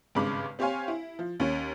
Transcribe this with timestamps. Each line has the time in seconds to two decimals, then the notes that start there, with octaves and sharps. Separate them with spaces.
0.15 G#1 G2 C#3 G#3 B5 D6
0.59 C4 G4 C5 C#5 F5 G#5
0.88 E4
1.19 F3
1.40 D#2 C#4